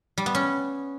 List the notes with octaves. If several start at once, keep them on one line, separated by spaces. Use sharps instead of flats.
G3
B3
C#4